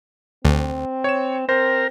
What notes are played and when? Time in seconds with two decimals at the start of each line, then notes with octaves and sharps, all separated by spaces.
0.45 D2 C4
1.04 C#5 E7
1.49 C4 A#4 C5